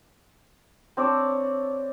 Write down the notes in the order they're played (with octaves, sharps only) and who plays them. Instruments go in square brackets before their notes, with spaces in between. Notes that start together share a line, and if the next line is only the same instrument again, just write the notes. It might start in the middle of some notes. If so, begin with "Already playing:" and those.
[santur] C4 D4 C#5 D5